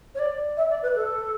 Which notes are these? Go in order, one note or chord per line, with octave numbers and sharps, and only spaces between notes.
C#5
D5
E5
D5
B4
A4